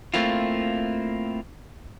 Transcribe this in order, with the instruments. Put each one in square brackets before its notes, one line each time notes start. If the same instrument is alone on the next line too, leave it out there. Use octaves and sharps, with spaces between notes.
[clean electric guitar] A3 A#3 C4 E4 F4